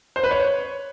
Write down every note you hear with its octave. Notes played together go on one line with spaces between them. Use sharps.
C5
B4
C#5